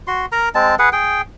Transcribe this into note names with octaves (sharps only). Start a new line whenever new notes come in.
F#4 C6
A#4 A#5
G#3 C4 A5
G#4 B4 F#5
G#4 G5